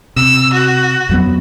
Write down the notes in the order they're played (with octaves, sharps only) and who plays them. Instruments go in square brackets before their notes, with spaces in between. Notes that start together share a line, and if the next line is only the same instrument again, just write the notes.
[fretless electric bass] C3 [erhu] E6
[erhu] F#4
[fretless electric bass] F2 F#3 B3